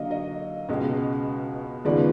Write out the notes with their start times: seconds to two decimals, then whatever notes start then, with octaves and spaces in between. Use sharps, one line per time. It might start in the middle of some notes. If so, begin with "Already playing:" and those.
Already playing: D3 F#3 A#3 D#5 F5
0.11 D#5
0.69 C#2 B2 G#3
1.85 D#2 C#3 F3 G#3 B3 D5